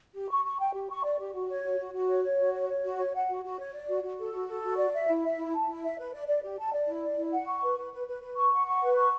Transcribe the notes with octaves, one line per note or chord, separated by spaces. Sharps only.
G4
C#6
C#6
G5
G4
C#6
D5
G4
F#4
C#5
F#4
F#4
F#4
C#5
C#5
F#4
C#5
C#5
F#4
C#5
F#5
F#4
F#4
C#5
D5
F#4
F#4
A4
F#4
A4
F#4
D5
E5
E4
E5
E4
A5
E4
E5
B4
D5
D5
G4
A5
D5
E4
D5
E4
F#5
C#6
B4
B4
B4
B4
B4
C#6
F#5
C#6
B4
C#6